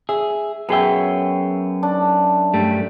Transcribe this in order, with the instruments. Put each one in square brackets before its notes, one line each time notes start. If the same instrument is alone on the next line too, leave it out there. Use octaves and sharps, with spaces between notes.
[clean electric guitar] G#4 [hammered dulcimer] E5
[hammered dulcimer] F#2 E5 [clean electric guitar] B3 G#4 G5
[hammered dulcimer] D4
[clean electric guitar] G2 G3 A3